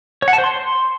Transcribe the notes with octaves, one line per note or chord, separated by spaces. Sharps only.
C#5
F#5
A5
C5
C6